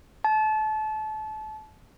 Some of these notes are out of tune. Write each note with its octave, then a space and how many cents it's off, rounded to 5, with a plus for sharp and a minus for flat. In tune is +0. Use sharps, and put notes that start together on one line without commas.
A5 -30